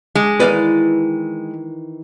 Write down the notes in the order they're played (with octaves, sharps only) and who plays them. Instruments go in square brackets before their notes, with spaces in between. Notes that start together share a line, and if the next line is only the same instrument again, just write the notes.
[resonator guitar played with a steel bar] G#3
[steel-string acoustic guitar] D#3 E3 [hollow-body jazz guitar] B4 D5 F5